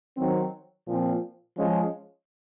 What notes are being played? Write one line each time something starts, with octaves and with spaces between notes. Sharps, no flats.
D#3 F#3 C4
A#2 F3 C4
F3 G#3 C#4 F4